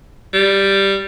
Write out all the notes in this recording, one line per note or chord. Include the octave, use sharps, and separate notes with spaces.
G3